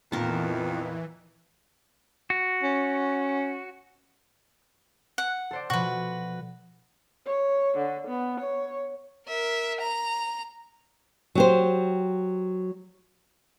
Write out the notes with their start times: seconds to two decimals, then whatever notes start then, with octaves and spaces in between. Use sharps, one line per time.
0.12 F2 A#2 D#3 E3 B3 A#4 A5
2.30 F#4
2.63 C#4
5.18 F#5
5.51 A4 C5 D5
5.70 B2 F3 F#4 B4
7.26 C#5
7.78 D3
8.08 B3
8.40 C#5
9.27 A#4 E5
9.80 A#5
11.35 F#3 G4 C5